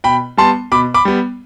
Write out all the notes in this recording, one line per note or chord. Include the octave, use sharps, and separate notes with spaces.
B2 G5 B5
G3 B3 A5 C6
B2 B5 D6
B5 D6
G3 B3